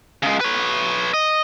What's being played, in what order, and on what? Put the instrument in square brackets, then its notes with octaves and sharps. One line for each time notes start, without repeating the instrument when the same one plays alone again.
[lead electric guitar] C#3 G#3
B4 C#5
D#5